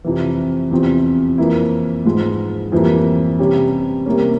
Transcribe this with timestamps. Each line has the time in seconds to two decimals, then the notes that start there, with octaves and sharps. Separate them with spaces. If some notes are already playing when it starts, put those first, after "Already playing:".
0.04 F2 C3 E3
0.71 E2 C3 F3 C4
1.38 F2 E3 A#3 E4
2.05 G#2 F3 G#3
2.72 F2 E3 G3 A#3
3.39 C3 G3 C#4 G4
4.06 C3 G3 A#3 C#4